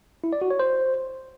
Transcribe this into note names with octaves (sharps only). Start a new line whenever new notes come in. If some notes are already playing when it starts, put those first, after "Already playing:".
E4
D5
F#4
C#5
C5